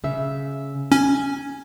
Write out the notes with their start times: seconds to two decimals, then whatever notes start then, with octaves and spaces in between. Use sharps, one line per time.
0.04 C#3 E5
0.92 C#4 G#5